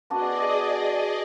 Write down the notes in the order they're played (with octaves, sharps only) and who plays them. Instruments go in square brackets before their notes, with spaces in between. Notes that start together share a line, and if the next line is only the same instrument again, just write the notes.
[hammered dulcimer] B3 D4 F#4 [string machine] G#4 D5 D#5